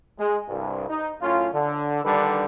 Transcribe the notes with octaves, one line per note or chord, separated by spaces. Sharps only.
G#3
C2 G2
D#4
F#2 A2 C#4 F4
D3
D3 D#3 G3 D4 A4 B4